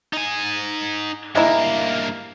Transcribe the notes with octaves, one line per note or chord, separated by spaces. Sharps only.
D#4 G#5
G2 G#3 A#3 D#4 E4